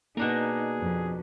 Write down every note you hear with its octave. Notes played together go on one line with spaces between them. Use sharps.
B2 A#3 D4 D#4 G#4 A#4
F2